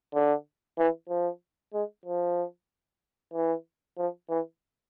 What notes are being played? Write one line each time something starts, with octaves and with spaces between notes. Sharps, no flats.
D3
E3
F3
G#3
F3
E3
F3
E3